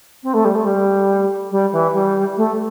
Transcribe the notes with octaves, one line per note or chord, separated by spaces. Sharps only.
C4
A3
G3
A3
G3
G3
E3
G3
A3